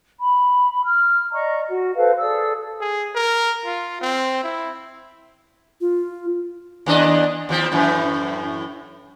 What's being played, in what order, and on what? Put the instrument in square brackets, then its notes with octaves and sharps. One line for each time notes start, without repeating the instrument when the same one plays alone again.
[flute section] B5
F6
D5 D#5 A#5 C#6
F#4
A4 B4 C5 F5
G#4 A4 D5 E6
[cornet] G#4
A#4
F4
C4
E4
[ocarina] F4
[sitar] D#2 D4 D#5
D#2 F3 C4
F#2 A2 E3